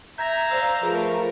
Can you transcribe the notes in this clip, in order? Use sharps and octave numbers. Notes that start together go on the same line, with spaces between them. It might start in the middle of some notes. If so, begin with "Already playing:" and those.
E5 A#5 G6 G#6 A#6
C5 D5 F5 E6 G6
F3 A3 G#4 A#4 B4